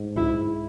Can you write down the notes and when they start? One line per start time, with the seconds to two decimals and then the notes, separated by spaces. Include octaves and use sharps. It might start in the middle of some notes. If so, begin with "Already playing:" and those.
Already playing: G#2
0.17 E4